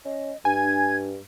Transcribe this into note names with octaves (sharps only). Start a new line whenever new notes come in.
C#4 D#5
G2 D4 G#5 G#6